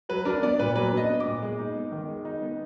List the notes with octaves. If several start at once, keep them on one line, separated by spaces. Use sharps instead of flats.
F#3 B4
D4 A#4
B3 D5
A#2 B4
F#3 B4
D4
D#5
B3
D6
A#2
G#3
D#4
B3
D#3
G#3
D#4
B3